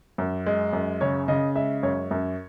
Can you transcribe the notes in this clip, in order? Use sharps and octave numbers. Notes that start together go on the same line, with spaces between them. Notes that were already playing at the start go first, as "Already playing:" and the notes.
F#2
G#3
F#2
C#3 C#5
C#3 D#5
G#3 E5
F#2 C#5
F#2